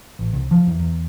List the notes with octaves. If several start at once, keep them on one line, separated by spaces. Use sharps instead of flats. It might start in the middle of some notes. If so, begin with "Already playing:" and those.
A1
C2
F3
E2
E2